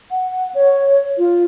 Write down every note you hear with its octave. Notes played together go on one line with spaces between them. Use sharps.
F#5
C#5
F4